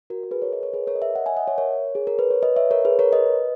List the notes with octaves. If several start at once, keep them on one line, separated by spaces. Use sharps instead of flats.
F#4 A#4
A#4
G#4 B4
A#4 C#5
B4 D#5
A#4 C#5
G#4 B4
A#4 C#5
D#5
C#5 E5
D#5 F#5
E5 G#5
D#5 F#5
C#5 E5
A#4 C#5
G#4
A#4
B4
C#5
B4 D#5
C#5 E5
A#4 C#5
G#4 B4
A#4 C#5
B4 D#5